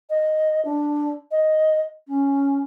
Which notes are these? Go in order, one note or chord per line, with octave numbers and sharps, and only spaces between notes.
D#5
D4
D#5
C#4